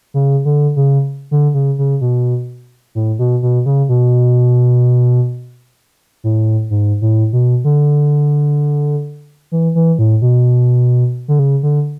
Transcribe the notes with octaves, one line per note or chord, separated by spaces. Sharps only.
C#3
D3
C#3
D3
C#3
C#3
B2
A2
B2
B2
C#3
B2
A2
G#2
A2
B2
D3
E3
E3
A2
B2
D3
C#3
D3